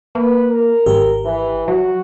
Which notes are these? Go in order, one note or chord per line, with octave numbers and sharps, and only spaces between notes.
A#3 B4
A#4
G#1 G4
E3
F#3 F#4